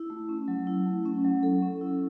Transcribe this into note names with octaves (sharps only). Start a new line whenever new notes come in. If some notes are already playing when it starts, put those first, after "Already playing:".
Already playing: E4
A3
C#4
F#3
E4
A3
C#4
F#3
A4
C#4
E4